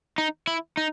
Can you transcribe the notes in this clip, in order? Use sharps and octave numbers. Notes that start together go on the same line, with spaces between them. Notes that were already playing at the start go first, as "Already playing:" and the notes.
D#4
E4
D#4